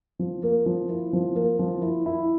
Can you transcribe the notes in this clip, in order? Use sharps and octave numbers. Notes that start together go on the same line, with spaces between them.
F3
A#3
F3
E4
F3
A#3
F3
E4
E4